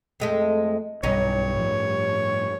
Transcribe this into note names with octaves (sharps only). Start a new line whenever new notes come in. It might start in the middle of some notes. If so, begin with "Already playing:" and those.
F2 G#3 A3
B1 G2 E3 G3 C#4 D#4 C#5
A2 F3